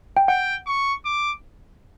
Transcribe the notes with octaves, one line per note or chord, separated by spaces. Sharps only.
G5
F#5 G5
C#6
D6